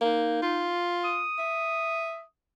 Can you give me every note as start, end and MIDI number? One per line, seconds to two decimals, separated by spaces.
0.01 0.40 58
0.01 0.75 63
0.42 1.24 65
1.05 2.25 87
1.38 2.21 76